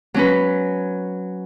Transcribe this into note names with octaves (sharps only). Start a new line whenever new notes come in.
F#3 C#4 B4